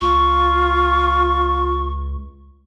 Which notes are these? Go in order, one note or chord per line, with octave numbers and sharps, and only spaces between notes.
C#2 F4 C#6